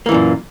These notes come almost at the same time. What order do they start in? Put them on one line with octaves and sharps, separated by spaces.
A#3 E3 F#2 A#2